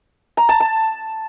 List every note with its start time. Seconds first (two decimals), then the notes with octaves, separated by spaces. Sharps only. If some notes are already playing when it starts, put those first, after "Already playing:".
0.37 A#5
0.49 A5
0.60 A5